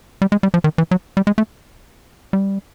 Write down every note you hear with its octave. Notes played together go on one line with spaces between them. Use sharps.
G3
G#3
G3
F3
D#3
E3
F#3
G3
G#3
A3
G3